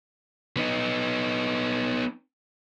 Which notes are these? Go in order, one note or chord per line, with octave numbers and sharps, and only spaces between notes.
B3 D#4